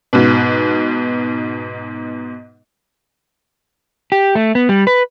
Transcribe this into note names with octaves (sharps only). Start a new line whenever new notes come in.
G#2 B2
G4
A3
B3
G3
B4